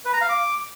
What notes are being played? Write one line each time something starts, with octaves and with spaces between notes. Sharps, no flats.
B4
A#5
F5
D6